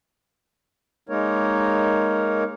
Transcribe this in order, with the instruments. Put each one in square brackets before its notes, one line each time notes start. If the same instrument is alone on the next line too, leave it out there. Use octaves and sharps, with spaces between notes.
[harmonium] G#3 A#3 D#4 A#4 C#5